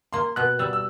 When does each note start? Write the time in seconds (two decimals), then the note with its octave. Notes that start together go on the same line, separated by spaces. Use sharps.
0.13 A#3 C6
0.36 B2 F#6
0.59 G3 E6
0.73 E6